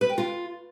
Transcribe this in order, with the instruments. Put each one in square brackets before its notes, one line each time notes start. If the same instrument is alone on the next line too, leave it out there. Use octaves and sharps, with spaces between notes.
[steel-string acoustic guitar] B4
G5
F4